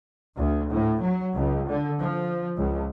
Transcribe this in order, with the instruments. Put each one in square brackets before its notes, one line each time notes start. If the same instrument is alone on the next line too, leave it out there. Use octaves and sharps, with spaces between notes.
[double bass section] D2
A2
F#3
C#2
D3
F3
C#2